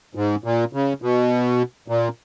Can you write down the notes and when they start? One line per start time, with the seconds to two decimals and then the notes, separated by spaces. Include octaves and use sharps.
0.15 G#2
0.44 A#2
0.73 C#3
1.02 B2
1.88 A#2